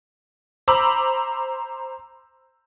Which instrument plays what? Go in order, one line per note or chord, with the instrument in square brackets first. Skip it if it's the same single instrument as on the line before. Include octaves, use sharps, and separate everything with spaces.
[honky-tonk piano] C5 A#5 B5 D6 E6